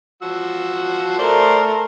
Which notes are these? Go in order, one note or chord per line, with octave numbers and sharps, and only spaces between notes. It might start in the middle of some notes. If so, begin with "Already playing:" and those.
F3 F#4 E6
A3 A#4 C5 D5 C6